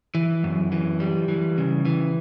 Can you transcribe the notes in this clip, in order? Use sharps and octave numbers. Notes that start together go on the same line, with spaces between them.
E3
F#2
E3
G3
E3
C#3
E3